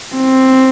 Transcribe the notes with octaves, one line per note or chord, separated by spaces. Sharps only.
C4